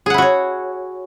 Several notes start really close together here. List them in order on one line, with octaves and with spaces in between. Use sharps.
G#4 F#5 E4 F#4 C#5